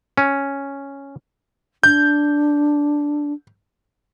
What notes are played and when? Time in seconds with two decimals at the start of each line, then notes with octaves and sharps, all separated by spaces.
0.18 C#4
1.83 D4 G6